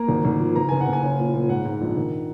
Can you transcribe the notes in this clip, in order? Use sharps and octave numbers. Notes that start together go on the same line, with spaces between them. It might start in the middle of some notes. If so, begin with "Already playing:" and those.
Already playing: A#3 A#5
G#1
G#1
F3
F#1 A#5
F#1 G#5
F#5
F#1
G#5
C#4
A#2
A#2
G#2 F#5
G#2
A#1
D#3